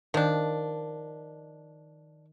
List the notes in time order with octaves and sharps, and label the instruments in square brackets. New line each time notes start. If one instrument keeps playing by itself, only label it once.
[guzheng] D#3 [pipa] F3 D4